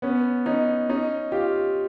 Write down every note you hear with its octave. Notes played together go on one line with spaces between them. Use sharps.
B3 C#4
C#4 D#4
C#4 D#4
F4 G4